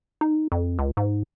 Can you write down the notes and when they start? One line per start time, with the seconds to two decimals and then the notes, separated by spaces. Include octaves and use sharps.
0.21 D#4
0.52 F2
0.79 C#2
0.97 G#2